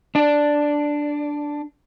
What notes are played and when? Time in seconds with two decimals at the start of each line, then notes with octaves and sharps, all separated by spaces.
0.15 D4 D5